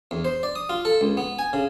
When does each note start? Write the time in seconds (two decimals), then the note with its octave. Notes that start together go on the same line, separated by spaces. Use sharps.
0.11 E2
0.25 C5
0.43 D5
0.56 D#6
0.69 F4
0.85 A4
1.01 C#2
1.17 B3
1.39 G#5
1.53 C#3